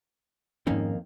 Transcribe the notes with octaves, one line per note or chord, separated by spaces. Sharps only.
F2 G#2 D#3 A#3 C#4